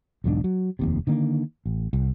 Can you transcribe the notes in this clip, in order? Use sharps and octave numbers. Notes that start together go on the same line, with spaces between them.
B1 E2 G#2 D4
F#3
F1 D#2 C3
D3 D#3 A#3
A1
C2